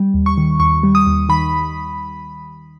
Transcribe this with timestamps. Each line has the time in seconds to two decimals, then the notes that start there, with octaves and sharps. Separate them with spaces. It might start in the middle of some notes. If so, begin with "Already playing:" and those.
Already playing: G3
0.14 D#2
0.26 C#6
0.38 D#3
0.60 D#2 C#6
0.83 G3
0.95 D#6
1.07 D#2
1.29 D#3 B5